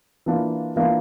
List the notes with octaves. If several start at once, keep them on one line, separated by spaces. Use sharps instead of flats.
E3 A#3 D4 F4
E3 A#3 D4 F4